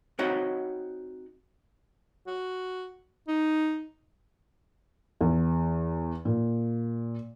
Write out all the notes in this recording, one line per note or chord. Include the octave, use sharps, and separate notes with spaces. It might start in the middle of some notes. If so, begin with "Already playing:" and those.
C4 D#4 F#4 C#5 D#5 F#5
F#4
D#4
E2
A#2